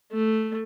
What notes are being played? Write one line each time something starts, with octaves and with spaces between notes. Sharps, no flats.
A3